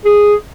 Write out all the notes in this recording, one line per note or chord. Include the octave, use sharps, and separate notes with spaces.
G#4